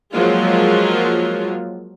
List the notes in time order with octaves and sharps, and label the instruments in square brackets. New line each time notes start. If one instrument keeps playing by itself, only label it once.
[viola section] F3 F#3 G#3 A#3 F4